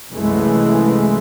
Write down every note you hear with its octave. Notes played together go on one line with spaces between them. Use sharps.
C2 F#2 E3 G#3 A3